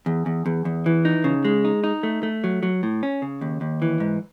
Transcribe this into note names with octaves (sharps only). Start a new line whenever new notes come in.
E2
E2
E2
E2
E3
D#4
C#3
G#3
D#4
D#4
A3
A3
F#3
F#3
A2
C#4
C#3
D#2
D#2
E3
G#2